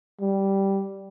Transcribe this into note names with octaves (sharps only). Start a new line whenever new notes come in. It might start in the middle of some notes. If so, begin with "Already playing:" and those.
G3